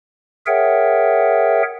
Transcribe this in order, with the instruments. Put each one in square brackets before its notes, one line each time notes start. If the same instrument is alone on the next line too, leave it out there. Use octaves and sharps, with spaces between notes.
[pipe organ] G#4 A#4 C#5 E5 F#5 G5